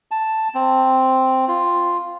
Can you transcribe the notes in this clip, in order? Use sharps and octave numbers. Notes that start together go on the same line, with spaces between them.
A5
C4
F4